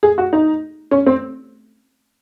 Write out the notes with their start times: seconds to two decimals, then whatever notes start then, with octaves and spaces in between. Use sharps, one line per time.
0.03 G#4
0.18 F#4
0.33 D#4
0.91 C#4
1.06 C4